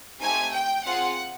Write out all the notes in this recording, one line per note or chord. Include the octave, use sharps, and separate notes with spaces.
A3 C4 D#4 G4 G#5
G5
C4 F4 G#4 F#5